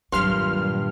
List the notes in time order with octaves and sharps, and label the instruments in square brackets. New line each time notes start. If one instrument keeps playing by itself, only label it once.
[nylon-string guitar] G2 [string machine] A#2 [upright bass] D#3 F#3 [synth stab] C6 F6